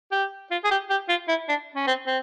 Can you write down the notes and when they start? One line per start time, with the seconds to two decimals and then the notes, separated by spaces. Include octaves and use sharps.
0.12 G4
0.51 F4
0.64 G#4
0.71 G4
0.90 G4
1.09 F4
1.28 E4
1.49 D4
1.76 C#4
1.87 C4
2.07 C4